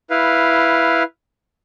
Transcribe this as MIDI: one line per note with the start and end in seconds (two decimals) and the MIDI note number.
0.10 1.03 64
0.10 1.03 71
0.10 1.03 77